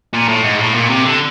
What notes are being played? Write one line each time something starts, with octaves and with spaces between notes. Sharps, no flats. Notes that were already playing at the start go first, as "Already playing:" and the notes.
A#2
A2
G#2
A2
A#2
C3
D3